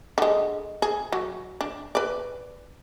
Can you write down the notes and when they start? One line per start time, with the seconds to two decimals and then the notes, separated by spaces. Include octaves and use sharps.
0.18 D3 G#3
0.82 G#4
1.12 F#3
1.61 D4
1.95 B4 D5